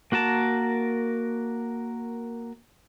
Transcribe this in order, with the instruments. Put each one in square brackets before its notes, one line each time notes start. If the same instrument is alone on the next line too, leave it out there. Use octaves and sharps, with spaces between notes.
[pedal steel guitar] A#3 F#4 A#4 A5